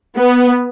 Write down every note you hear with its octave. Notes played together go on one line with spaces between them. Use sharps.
B3